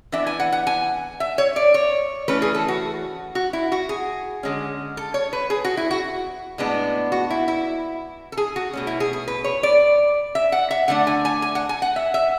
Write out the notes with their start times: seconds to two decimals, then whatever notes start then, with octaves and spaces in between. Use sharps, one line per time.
0.12 E3 B3 D4 E5
0.27 G#5
0.40 F#5
0.52 F#5
0.67 G#5
1.20 E5
1.38 C#5
1.56 D5
1.74 C#5
2.28 E3 A3 C#4 B4
2.42 G#4
2.55 A4
2.68 F#4
3.35 F#4
3.53 E4
3.72 F#4
3.89 G#4
4.43 D3 G#3 C#4
4.97 A4
5.14 C#5
5.33 B4
5.50 G#4
5.65 F#4
5.77 E4
5.91 F#4
6.58 A2 G#3 B3 D4
7.12 F#4
7.30 E4
7.48 E4
8.32 A4
8.37 G#4
8.56 F#4
8.73 B2 A3 C#4
8.87 E4
9.00 G#4
9.13 G#4
9.28 B4
9.44 C#5
9.63 D5
10.35 E5
10.52 F#5
10.71 E5
10.88 D3 A3 D4 F#5
11.07 G#5
11.25 G#5
11.42 G#5
11.55 F#5
11.69 G#5
11.82 F#5
11.96 E5
12.14 E5